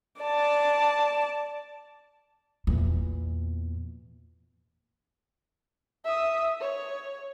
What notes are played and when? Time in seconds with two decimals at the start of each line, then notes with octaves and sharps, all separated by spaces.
0.22 D5 A5
2.67 E2 A#2
6.05 E5 D#6
6.60 C#5